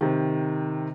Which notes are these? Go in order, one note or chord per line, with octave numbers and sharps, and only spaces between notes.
C3 D#3